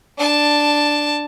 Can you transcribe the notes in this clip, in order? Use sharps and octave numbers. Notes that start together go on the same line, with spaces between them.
D4 A5